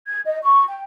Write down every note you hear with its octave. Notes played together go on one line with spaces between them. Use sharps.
G#6
D#5
C#6
G5